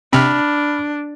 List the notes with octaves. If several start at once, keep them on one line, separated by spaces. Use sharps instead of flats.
C3 C4 D4 B5 F6